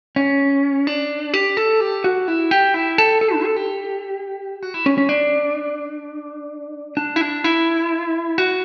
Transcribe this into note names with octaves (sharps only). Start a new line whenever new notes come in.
C#4
D4
G4
A4
G4
F#4
E4
G4
E4
A4
A4
D4
A4
G4
F#4
E4
C#4
C#4
D4
D4
E4
D4
E4
F#4